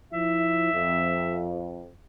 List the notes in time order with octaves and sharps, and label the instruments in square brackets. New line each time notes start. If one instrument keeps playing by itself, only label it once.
[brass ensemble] F3 E4 [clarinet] E5
[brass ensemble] F2